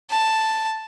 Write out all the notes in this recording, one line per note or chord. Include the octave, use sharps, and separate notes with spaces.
A5